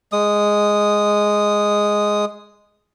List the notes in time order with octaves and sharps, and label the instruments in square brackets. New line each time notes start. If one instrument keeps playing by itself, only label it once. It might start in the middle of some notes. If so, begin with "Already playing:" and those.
[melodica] G#3 D#6